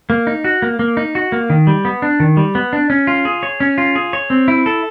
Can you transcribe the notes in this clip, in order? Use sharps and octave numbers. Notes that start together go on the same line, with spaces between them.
A#3
D#4
F#4
A#3
A#3
D#4
F#4
A#3
D#3
G3
B3
D4
D#3
G3
B3
D4
C#4
F4
G#4
C#5
C#4
F4
G#4
C#5
C4
E4
A4